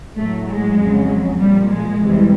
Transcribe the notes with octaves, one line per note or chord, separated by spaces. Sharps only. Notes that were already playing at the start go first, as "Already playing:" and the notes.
A2 F#3 A3
G#3
F2 C#3 F#3
A#2 F3 G3
G#3
F2 C3 E3 G3